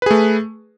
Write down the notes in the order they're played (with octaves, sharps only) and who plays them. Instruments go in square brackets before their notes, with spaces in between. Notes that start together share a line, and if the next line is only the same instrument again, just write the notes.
[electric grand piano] B4
G#4
A3